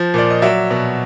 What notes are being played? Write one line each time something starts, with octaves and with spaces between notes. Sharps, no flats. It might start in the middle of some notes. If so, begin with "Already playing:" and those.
Already playing: F3
A#2 D5
D#5
F#3 D5 E5
B2